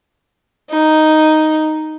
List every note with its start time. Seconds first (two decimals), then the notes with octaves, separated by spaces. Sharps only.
0.70 D#4